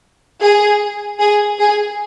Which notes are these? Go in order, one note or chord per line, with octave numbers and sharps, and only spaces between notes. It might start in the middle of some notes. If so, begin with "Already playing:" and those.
G#4
G#4
G#4